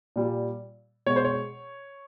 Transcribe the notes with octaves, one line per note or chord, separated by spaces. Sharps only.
A#2 G3
B2 G#3 C#5
C5
C#5